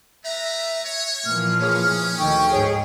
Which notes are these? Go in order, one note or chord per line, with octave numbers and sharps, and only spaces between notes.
A3 B4 E5 A#5
C#5
A#2 E3 F3 F6
C#4 G#4 C#5
D2 D#3 A4 G5 C#6
G#2 G#4 C#5